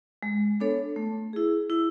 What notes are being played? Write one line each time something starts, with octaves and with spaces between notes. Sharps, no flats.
G#3
B3 D4 A4 C#5
A3
E4 G#4
E4